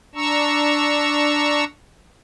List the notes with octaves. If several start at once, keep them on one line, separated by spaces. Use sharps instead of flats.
D4 A#5 C#6 E6